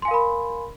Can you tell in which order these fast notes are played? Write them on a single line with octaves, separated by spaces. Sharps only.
C6 G#5 F5 A#4 B5